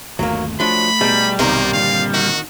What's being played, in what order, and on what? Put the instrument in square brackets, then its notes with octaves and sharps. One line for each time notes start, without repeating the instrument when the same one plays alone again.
[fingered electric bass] G1 D#2 A3 [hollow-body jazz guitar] F#3 A#3
[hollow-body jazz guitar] F3 F#3 D4 [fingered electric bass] A3 [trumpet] B5
[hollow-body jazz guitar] B2 D#4 G#4 [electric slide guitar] G3
[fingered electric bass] B1 B3 [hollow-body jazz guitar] G2 C3 D#3 [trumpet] A#3
[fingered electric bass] A#2 D3 [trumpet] F5
[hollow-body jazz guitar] D#3 [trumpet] F#4